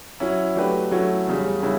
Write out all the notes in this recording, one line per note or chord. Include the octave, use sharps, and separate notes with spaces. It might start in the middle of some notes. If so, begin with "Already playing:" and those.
F#3 C#4 E4
F#3 A3 D4 G4 B4
F#3 A3 C#4 E4
E2 C#3 G3
C#3 G3 B3 E4